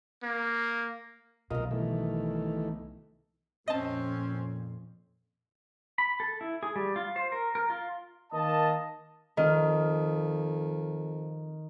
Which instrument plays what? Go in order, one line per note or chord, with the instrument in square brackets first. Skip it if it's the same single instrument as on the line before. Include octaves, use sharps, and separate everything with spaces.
[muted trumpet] A#3
[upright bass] B1 B2 [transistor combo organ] F4 A#4 D#5
[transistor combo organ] D#3 E3 A3
[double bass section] F2 A#2 [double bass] C4 C#4 [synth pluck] D#5 A5
[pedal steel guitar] B5
A4
E4
G#4
G3
F4
C5
A#4
A#4
F4
[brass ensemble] D#3 A#3 D#5 A5
[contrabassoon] F2 [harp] D#3